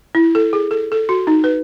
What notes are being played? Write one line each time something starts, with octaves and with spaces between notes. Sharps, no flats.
E4
A4
G#4
A4
A4
F#4
D#4
B4